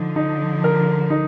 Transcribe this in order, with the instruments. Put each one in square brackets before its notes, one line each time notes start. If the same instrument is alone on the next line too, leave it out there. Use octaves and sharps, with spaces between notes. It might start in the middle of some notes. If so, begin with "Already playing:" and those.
Already playing: [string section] D3 F3 [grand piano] D#4
[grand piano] D#4
A#4
D#4